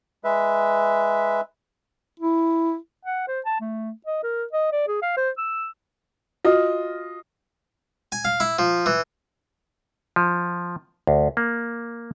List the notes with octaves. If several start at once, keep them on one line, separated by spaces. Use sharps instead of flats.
G#3 B4 E5
E4
F#5
C5
A5
A3
D#5
A#4
D#5
D5
G#4
F5
C5
E6
F4 F#4 D#5
G#5
F5
E4
F3
E3
F3
D2
A#3